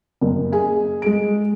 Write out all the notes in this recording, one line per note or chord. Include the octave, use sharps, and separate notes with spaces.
F#1
G#4 G#5
G#3 G#4 D7